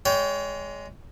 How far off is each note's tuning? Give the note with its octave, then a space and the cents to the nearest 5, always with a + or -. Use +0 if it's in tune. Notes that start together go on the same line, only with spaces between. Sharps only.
G#3 +0 C#5 +35 G5 +0